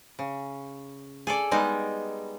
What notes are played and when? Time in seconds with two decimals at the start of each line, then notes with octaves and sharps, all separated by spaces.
0.19 C#3
1.27 G#4 A4 D5
1.51 G3 G#3 B3 D#4